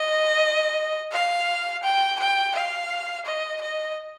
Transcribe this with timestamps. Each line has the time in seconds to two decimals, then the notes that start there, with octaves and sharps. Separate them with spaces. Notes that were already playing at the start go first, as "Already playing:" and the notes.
Already playing: D#5
1.13 F5
1.83 G5
2.20 G5
2.55 F5
3.26 D#5
3.62 D#5